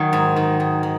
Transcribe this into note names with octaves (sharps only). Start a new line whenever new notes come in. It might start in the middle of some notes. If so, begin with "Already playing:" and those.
Already playing: D#3 F#3
G#2
D#3
G#2
D#3